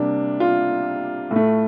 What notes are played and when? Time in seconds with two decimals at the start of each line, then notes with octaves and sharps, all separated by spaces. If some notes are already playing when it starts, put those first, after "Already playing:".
Already playing: C3 G3 A#3 D4
0.40 F4
1.31 A2
1.36 A3